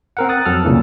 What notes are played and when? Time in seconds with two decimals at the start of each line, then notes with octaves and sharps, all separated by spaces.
0.17 C4 A#4 F#5
0.29 D#6 F#6 A6
0.45 F2 F#3 A4 F6
0.64 C2 A#2 C#3 E3